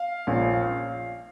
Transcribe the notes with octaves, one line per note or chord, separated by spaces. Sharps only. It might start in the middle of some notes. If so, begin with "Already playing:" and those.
Already playing: F5
A#1 A#2 A#3 C#4